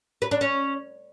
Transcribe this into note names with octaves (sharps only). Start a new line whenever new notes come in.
B4
D4
C#4